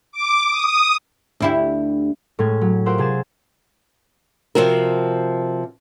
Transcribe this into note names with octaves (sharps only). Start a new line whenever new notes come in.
D6
D#6
D2 E4 G4
A2 G#3 C#4 G#6
F#3
F4 G4 A#4 C5 F#5 E6
C3 G#4 G#5 A6 E7
C3 F3 C4 F#4 A#4